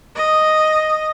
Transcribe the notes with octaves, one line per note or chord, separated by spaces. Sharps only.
D#5